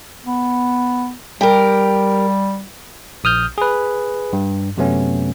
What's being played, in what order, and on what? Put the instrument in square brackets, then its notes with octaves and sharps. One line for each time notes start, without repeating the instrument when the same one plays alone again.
[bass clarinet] B3
[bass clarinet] G3 [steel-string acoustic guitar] G4 A#4
[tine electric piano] A#1 D#6 F6 G6
G#4 B4
G2
F#2 C3 F#3 A3 B3 C#4